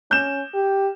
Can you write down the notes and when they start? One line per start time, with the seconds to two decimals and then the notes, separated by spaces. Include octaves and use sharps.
0.11 C#4 G6 E7
0.54 G4